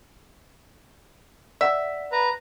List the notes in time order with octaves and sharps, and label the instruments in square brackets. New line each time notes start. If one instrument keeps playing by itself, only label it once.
[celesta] D5 F#5 [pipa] E5
[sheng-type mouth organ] B4 A#5